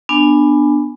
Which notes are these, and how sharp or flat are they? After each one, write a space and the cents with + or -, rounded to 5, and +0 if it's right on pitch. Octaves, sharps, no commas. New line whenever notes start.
B3 +0 D4 +15 G#5 +0